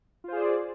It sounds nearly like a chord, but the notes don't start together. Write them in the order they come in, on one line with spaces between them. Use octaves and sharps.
F4 C5 G#4 D5